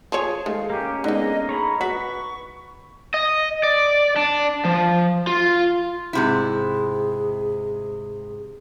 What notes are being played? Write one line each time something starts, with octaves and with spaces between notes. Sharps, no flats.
F3 G#4 C#5
D#3 G#3 A3 F5
A#3 C#4 G4
D3 G#3 B3 D#4 D#5
G#4 C#5 A#5 B5
F#4 B4 C#6 B6
D#5
D5
D4
F3
F4
G#2 C3 E4 G#4